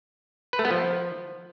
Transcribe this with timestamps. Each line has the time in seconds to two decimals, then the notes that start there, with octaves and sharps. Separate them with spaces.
0.53 B4
0.59 A3
0.65 B3
0.71 F3